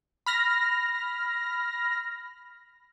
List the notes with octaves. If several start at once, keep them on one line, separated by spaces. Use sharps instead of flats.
B5 F6 A#6